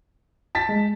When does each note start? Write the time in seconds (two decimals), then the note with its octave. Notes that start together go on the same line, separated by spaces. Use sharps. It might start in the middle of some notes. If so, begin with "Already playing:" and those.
0.55 A5 A6 B6
0.69 G#3